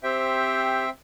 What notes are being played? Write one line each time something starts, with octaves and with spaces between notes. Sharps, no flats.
C4 G4 C5 E5 G5